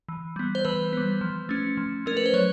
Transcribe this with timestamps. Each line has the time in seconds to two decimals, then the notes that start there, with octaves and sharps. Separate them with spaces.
0.09 E3
0.36 G3 B3
0.55 C5
0.65 E3 B4
0.93 G3 B3
1.21 F3
1.49 A3 C#4
1.77 F3
2.06 A3 C#4 A#4
2.17 B4
2.26 C5
2.34 F#3 C#5